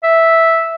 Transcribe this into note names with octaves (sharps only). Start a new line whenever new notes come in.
E5